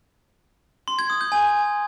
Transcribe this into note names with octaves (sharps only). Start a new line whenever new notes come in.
C6
G#6
D#6
G6
G#5